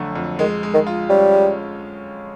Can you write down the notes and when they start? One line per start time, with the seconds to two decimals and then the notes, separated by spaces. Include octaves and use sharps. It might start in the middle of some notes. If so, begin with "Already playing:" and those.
Already playing: F2 D3 F#3 A3
0.16 F2
0.39 D#3 G#3
0.63 G#3
0.74 D#3
0.87 F4
1.10 G3 C#4
1.33 G#3